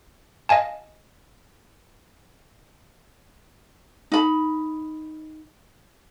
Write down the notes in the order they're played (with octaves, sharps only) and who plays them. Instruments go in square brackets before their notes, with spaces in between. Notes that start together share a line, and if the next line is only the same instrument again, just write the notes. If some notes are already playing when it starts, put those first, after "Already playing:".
[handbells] D#5 F5 G#5 A5
[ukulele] D#4 B5